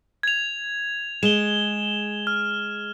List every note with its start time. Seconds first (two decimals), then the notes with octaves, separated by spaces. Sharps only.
0.23 G#6 F7
1.23 G#3 E7 G7
2.27 F6